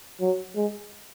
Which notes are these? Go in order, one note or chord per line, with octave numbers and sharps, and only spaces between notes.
F#3
G#3